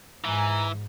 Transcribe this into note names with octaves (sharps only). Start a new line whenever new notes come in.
G#2 E3 G#5 A#5